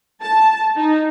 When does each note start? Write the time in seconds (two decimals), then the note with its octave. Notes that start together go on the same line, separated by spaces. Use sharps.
0.21 A5
0.76 D#4